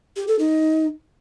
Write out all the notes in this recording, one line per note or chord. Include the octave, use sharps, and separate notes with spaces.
G4
A4
D#4